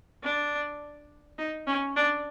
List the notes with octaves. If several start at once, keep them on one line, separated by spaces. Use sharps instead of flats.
D4
D#4
C#4
D4